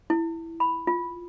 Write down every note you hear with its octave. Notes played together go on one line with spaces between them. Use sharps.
E4
B5
F4